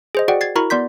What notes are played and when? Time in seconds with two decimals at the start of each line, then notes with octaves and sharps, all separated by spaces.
0.15 G#4 C5 D#5
0.28 F#4 G#4 D5 F#5 G5
0.41 G#6 A6 C7
0.55 E4 F#4 A#4 A#5 B5 C#6
0.70 B3 D5 C6 G6 B6